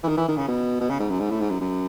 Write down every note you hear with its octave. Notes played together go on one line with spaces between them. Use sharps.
E3
D#3
E3
D#3
C#3
B2
B2
C#3
G#2
F#2
G#2
A2
G#2
F#2
F#2